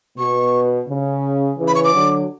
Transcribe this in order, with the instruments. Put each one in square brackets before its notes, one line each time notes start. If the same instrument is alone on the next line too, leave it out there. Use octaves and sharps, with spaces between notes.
[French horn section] B2 [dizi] C#6
[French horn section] C#3
C#3 E3
[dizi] B5
C#6
D6
[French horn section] D3 F#3